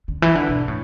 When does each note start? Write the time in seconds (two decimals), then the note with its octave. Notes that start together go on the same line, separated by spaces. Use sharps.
0.08 D3
0.22 E3
0.35 D3
0.48 B2
0.68 A2